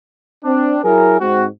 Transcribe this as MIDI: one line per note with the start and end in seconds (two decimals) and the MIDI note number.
0.44 0.79 60
0.44 0.79 62
0.84 1.20 54
0.84 1.20 64
0.84 1.20 68
0.84 1.20 70
1.21 1.45 44
1.21 1.45 60
1.21 1.45 66